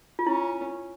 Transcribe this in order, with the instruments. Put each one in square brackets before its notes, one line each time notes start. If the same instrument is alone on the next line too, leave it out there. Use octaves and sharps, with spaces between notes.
[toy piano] F4
[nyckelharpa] C#4 [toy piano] E4